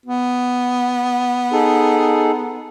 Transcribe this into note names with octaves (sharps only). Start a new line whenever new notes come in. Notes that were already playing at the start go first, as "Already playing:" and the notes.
B3
D#4 G#4 A4